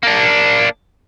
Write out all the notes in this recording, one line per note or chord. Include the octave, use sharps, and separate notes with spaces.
A#3 D4